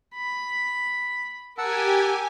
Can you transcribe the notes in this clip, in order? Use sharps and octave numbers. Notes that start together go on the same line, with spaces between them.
B5
G4 A#4 F#5 G#5 A5 E6